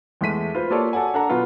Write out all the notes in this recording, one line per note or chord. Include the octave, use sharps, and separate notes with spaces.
E2 G#3 A3 B6 D#7
F4 B4 C5
A#3 F4 G4 A4 C#5 D5
F#4 A4 D5 F#5 G#5
D4 A4 F#5 A#5
B2 F#3 B3 F4 B4